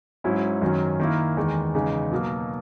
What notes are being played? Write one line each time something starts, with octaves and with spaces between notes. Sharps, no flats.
G#2 F#3 C#4 E4
F#2 D#3 F#3 C#4
D#3 A#3 E4
E2 D#3 G#3
E2 C#3 G#3 D#4
B2 F#3 A#3